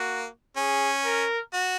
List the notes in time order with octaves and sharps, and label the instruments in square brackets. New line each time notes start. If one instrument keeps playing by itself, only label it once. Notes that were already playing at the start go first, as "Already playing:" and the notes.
Already playing: [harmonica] A#3 [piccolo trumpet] F#4
[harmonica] C#4 [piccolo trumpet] G#4
[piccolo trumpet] A#4
[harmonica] F#4